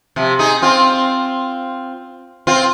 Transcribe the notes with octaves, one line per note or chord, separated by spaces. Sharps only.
C3 F3
D#4 G#4
C4 F4
C4 F4